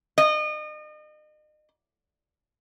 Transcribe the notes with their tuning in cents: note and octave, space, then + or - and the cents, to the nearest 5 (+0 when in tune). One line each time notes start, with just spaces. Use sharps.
D#5 -35